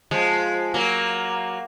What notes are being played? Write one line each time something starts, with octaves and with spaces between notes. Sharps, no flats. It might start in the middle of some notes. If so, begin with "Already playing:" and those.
F3 G#3
F#3 A#3